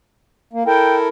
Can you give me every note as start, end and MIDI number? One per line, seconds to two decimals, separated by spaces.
0.53 0.63 58
0.66 1.08 64
0.66 1.08 69
0.66 1.08 70
0.66 0.96 79